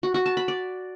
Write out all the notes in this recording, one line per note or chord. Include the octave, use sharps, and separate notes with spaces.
F#4
F#4
A5
B5
D5